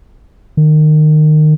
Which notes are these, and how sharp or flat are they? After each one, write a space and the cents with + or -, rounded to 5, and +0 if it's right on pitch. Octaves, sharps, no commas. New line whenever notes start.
D#3 -25